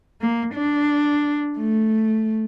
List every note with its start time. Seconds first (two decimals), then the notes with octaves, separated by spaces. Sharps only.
0.21 A#3
0.54 D4
1.59 A3